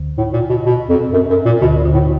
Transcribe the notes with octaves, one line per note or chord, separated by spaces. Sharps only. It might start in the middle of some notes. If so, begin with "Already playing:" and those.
Already playing: D2 D3
A2
A#2
B2
B2
F2
F#2
F#2
A#2
D2 B2 D3
A#2
D2 D3
A2